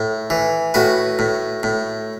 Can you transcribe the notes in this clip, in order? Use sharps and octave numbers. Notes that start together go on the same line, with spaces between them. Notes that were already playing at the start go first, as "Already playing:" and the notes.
Already playing: A2
E3
A2 F#4 B4
A2
A2